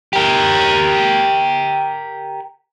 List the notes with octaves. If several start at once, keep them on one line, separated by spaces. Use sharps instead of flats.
G4 A#4